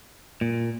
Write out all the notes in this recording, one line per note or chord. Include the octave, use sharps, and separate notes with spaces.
A#2